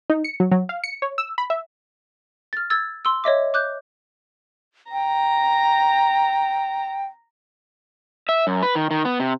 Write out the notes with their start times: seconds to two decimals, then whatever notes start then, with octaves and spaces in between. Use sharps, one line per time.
0.10 D#4
0.24 C#7
0.40 F#3
0.51 F#3
0.69 F5
0.84 C#7
1.02 C#5
1.18 E6
1.38 B5
1.50 E5
2.53 F6 A6
2.70 E6 G#6 A6
3.05 C6 E6
3.24 C#5 D#5 E5 D6
3.54 D6 F#6 G6
4.92 G5 A#5
8.29 E5
8.47 F#2
8.63 B4
8.75 D#3
8.91 D#3
9.05 B3
9.20 C3